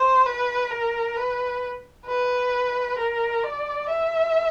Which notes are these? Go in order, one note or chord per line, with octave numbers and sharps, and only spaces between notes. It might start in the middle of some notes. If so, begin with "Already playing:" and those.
Already playing: C5
B4
A#4
B4
B4
A#4
D5
E5